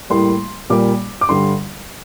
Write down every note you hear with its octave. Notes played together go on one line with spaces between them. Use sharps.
A2 G3 A#3 C6
A#2 G3 A#3 D6
D6
G2 D3 G3 C6